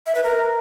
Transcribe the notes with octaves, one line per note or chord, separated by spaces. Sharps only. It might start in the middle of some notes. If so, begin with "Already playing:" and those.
E5
B4
A#4